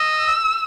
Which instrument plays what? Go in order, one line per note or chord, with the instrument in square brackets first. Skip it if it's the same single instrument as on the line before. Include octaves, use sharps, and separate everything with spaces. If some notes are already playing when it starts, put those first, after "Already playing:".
Already playing: [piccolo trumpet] D#5 [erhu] E6